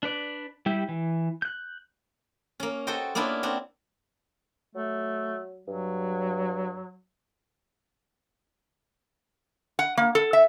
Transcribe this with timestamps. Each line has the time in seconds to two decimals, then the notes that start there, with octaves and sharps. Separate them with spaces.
0.03 D4 B4 D5
0.66 G3 E4 G4
0.88 E3
1.42 F#6 G6
2.60 A#3 C#4
2.87 F#4 A4 C5 D#5 G5
3.15 A#3 B3 C#4 D4 E4 F4
3.43 C4 D4 F#4
4.75 F#3 A3
5.68 G2 F#3
9.79 F#5
9.97 A#3
10.15 A4
10.33 E5